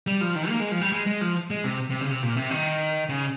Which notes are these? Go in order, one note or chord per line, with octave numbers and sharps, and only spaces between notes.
G3
F3
D#3
A#3
G#3
F3
G3
G#3
G#3
F3
G#3
C3
C3
C#3
C3
A#2
C3
D#3
C#3